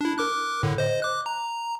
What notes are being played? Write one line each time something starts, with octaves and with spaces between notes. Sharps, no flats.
D4 E4
A#4 D6 F#6
A2 D3
C5 D#5
D6 F#6
A#5